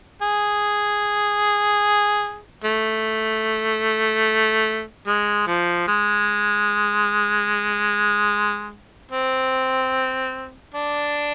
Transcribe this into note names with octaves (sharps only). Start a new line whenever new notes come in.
G#4
A3
G#3
F3
G#3
C4
D4